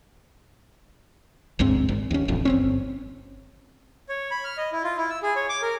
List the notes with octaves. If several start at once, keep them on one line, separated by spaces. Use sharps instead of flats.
G1 D2 G#2 C4
G#1
D#2 C#4
D#1 A1 F2
G1 C4 C#4
C#5
B5
F6
D#5
E4
F4
E4
E6
G#4
C#5
D6
A#4